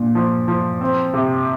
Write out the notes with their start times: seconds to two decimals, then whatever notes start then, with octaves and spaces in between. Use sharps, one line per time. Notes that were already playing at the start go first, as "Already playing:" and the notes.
Already playing: A#2 D4
0.15 F3
0.48 F3
0.81 C4
1.14 C3